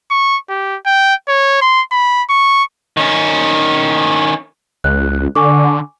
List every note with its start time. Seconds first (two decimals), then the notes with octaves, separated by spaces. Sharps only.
0.11 C#6
0.49 G4
0.86 G5
1.28 C#5
1.62 C6
1.92 B5
2.30 C#6
2.97 D#3 C#4
4.84 C#2 F#6
5.35 D3 G#5 C#6 D6